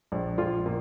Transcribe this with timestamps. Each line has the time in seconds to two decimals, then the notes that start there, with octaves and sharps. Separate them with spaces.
0.12 A#1
0.38 A#1 F4
0.66 A#2 A#3